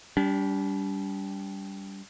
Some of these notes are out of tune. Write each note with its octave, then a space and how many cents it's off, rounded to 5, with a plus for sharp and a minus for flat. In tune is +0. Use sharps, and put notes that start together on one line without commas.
G3 +0 D4 -40